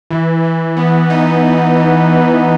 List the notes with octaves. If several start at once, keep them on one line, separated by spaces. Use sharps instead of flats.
E3
E3
B3
D#4
E3
E3
E3